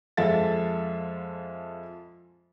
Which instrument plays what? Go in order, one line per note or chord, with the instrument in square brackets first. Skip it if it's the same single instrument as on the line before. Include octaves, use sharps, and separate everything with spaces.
[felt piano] F2 G#3 F4 A4 E5 A6